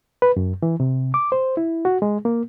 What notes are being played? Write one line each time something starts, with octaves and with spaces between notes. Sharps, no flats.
B4
F#2
E3
C3
D6
C5
E4
F#4
G#3
A#3